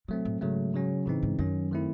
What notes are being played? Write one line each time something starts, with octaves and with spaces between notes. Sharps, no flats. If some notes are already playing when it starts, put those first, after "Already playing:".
C3 F#3 A3 C4
A2
G#2 C#3 F#3 A3
C#3 F#3 C#4
A2 C#3 E3 C4 D#4
G#2
F#2 D#3 F#3 C#4
D#3 A3 C4 E4